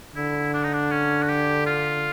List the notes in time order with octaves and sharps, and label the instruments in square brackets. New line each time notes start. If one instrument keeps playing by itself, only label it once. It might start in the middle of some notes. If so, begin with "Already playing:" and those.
[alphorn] D3 [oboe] E4
[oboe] D4
D#4
D4
C#4
F#4
G4
F4